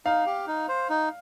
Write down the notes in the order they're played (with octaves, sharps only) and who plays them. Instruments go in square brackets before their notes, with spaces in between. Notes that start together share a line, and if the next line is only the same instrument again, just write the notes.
[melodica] D#4 [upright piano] F5
[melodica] G4
D#4
C5
D#4